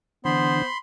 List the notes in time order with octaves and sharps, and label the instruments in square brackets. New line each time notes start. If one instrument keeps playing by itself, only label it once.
[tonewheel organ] D3 E3 D4 [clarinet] B3 [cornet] C5 [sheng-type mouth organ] B5 C6